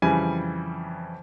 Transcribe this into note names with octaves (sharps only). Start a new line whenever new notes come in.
F2 C#3 E3 G3 G#5